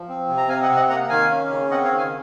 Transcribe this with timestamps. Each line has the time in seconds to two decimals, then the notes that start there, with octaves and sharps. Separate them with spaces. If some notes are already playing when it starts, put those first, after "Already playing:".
Already playing: F3
0.09 C4
0.29 C3
0.37 A#5
0.48 C4 F5 G#5
0.62 D#5 F#5
0.69 C3
0.76 D#5 F#5
0.90 A#3 F#5 A#5
1.09 D#3 F5 G#5
1.30 C#4
1.50 C#3
1.71 C4 D#5 F#5
1.84 C#5 F5
1.92 D#3
1.98 F5 G#5